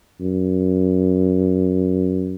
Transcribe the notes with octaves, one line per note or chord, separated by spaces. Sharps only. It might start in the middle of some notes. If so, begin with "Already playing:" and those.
F#2